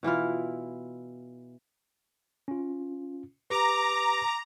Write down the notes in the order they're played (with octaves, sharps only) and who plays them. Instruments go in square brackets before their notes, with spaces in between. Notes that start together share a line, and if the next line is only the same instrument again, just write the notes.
[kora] B2 E3 E4 F4
[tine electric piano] C#4 F4
[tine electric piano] G4 B4 [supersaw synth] A#5 [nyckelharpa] D6